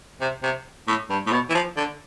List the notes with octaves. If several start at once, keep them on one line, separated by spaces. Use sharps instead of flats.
C3
C3
A2
G2
A2
B2
E3
F3
D3